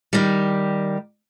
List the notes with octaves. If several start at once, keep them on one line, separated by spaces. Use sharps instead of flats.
D#3 G3